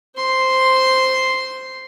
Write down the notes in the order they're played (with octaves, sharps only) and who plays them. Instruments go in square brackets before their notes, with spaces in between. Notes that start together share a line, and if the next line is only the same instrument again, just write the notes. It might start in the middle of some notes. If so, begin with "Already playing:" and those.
[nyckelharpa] C5 C6